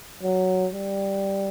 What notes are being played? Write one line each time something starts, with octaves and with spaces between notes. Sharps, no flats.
F#3
G3